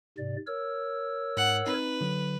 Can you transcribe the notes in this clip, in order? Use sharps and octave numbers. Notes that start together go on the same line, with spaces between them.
G#2 C3 D5
A#4 C#5 E6
G#2 F#5
C4 D#4 B4
D3 F#3